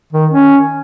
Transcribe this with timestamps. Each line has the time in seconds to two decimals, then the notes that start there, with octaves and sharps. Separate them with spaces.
0.12 D#3
0.31 C#4